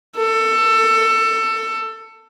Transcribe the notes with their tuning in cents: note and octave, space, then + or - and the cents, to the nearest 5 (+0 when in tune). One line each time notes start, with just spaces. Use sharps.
A4 +20